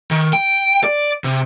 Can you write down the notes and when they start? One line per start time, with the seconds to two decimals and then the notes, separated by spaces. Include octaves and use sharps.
0.11 D#3
0.33 G5
0.84 D5
1.24 C3